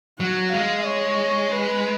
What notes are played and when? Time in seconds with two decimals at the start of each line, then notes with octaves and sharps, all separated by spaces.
0.19 F#3 F#5
0.52 G#3 F5
0.85 C#5
1.51 B4